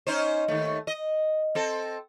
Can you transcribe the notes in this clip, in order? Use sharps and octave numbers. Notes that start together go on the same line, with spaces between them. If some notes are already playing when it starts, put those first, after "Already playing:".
C#4 D#4 C5
D#2 A3
D#5
C4 A4